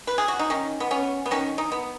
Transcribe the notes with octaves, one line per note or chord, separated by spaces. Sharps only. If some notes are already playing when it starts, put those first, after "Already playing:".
B4
G#4
F#4
D#4
D#3 C#4
B3
B3 C#4
B3
D#3 C#4
D#4
B3